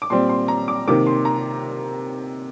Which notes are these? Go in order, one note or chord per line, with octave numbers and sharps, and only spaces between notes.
D6
A#2 G3 C4 C6
C6
A#5
D6
C3 D#3 A#3 D6
C6
A#5